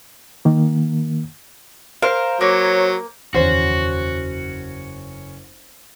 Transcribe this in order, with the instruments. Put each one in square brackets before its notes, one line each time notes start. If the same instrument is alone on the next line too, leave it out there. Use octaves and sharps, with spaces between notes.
[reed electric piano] D#3 A#3
[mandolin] A#4 F5 [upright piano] C5
[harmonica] F#3 [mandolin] A#3 [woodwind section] C#5
[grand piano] F#1 C#4 [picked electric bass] E2 D#3 E3 [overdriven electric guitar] F#4 [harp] C5